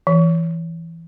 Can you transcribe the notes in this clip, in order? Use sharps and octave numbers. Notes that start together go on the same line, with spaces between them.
E3